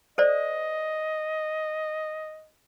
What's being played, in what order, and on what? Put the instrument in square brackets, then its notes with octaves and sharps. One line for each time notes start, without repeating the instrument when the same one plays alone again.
[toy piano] A4 C5 D5 [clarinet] D#5